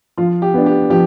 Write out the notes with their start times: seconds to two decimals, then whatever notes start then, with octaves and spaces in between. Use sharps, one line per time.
0.17 F3 F4
0.42 G4
0.54 B3 D4
0.66 G4
0.90 F3 G4